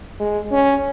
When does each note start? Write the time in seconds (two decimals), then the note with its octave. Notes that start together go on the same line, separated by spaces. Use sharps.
0.20 G#3
0.52 C#4